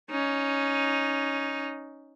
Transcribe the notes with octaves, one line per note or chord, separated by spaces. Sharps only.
C#4 D#4